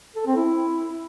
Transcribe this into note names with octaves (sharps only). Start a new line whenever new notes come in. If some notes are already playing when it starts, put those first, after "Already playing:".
A4
C4
E4